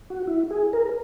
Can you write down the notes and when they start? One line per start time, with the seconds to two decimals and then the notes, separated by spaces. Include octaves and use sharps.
0.10 F#4
0.27 E4
0.51 G#4
0.73 A#4